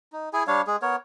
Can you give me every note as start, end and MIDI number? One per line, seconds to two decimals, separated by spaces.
0.12 0.29 63
0.33 0.43 64
0.33 0.43 68
0.33 0.43 80
0.47 0.62 55
0.47 0.62 62
0.47 0.62 73
0.47 0.62 77
0.67 0.76 56
0.67 0.76 68
0.82 0.96 59
0.82 0.96 70
0.82 0.96 73